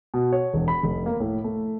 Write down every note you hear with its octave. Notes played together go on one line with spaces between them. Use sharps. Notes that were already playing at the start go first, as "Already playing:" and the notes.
B2
C#5
E1
B5
F1
A#3
A2
A3